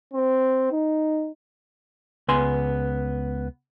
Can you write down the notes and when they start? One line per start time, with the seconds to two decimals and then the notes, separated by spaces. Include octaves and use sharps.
0.14 C4
0.72 D#4
2.28 C#2 B3 G#5 C6